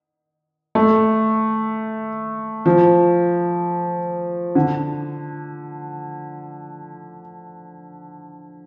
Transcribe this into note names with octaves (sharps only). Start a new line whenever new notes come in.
A3
F3
D3